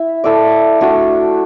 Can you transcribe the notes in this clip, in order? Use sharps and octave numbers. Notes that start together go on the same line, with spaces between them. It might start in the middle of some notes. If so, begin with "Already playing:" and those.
Already playing: E4
E4 A4 D5
A3 D4 F#4